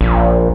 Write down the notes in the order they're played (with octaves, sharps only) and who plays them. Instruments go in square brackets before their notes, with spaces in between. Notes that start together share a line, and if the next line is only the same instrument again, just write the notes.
[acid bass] A#1